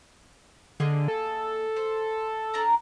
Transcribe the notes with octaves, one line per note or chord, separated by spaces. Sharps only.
D3 A#3 G#4 D#5
A4
C5
D4 A#4 A#5